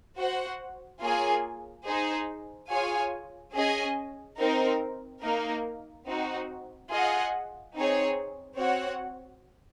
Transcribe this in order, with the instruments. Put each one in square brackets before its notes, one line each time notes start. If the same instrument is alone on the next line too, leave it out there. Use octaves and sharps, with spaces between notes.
[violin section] F#4 C5 F#5
A#3 F4 G#4 C#5 G#5
D#4 G#4 C5
F4 G#4 C#5 G#5
C#4 G#4 D#5 G#5
C4 D#4 A#4
A#3 D#4 A#4
C4 D#4 F#4
F4 G#4 D#5 F#5
C4 D#4 G#4 C#5
C4 F#4 C#5 F#5